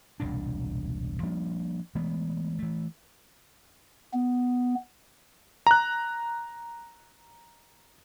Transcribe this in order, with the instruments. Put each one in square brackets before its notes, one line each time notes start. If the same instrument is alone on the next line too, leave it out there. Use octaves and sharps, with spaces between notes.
[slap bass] E1 C2 A#2 D4
F3 G3 A#3 D4
E3 G#3 A3 B3
E3 A3
[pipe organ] B3
[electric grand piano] A#5 F#6